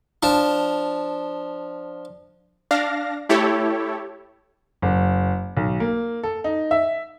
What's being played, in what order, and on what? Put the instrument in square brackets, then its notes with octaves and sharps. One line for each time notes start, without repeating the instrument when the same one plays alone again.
[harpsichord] F3 D4
[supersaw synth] D4 F5 A#6
A3 E4 G4 A4 C#5
[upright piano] F#1
B1
A#3
A4
D#4
E5